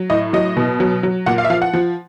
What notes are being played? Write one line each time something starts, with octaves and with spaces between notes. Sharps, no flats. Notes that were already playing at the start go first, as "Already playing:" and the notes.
Already playing: F#3
A2 D#5
F#3 D#5
B2
F#3
F#3
A#2 F#5
F5
E5
F3 F5
F#5
F3